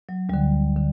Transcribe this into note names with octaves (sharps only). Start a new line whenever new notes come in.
F#3
D2 D3 G3
D3